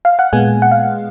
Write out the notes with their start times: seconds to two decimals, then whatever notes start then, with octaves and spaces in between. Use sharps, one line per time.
0.05 F5
0.19 F#5
0.33 A#2 G#3 B3 G#5
0.62 F#5
0.71 F5